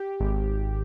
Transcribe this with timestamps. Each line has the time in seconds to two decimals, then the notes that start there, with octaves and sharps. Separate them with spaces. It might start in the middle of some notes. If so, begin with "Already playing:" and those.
Already playing: G4
0.20 G#1